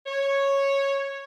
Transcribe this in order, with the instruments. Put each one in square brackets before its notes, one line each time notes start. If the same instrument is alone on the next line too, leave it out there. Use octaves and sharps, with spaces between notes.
[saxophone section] C#5